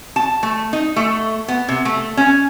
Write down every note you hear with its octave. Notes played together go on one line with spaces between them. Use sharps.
A5
A3
D#4
A3
B3
C3
A3
C#4